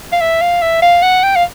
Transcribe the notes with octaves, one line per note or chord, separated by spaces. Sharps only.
F5
E5
F5
E5
F5
F#5
G5
F5